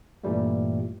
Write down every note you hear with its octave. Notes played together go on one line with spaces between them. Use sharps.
G2 A#2 E3 G3 A3